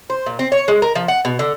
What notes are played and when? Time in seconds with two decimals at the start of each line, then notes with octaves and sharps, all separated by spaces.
0.10 C5
0.26 A#2
0.39 C4
0.52 C#5
0.68 G#3
0.82 A#4
0.95 F3
1.08 F#5
1.25 B2
1.39 D3